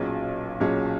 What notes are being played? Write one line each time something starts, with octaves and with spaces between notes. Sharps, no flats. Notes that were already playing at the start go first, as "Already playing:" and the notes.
Already playing: B1 A#2 F#3 C#4 G#4
B1 A#2 F#3 C#4 G#4